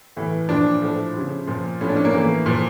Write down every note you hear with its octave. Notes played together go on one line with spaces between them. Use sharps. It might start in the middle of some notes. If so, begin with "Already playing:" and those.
A2 E3
A#2 F3 D4
A2 F3
C#3 F3
A#2 F3
A2 F3 C#4
D4
C#4
A#3
A2 E3
A#2 F3